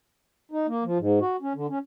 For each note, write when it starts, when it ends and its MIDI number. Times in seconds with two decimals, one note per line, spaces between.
0.52 0.67 63
0.68 0.84 58
0.84 0.98 53
0.99 1.19 44
1.21 1.37 66
1.42 1.53 61
1.55 1.67 50
1.70 1.79 61